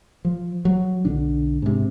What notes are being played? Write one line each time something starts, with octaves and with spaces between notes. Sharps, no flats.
F3
F#3
B1 D3 D4
G#2 C3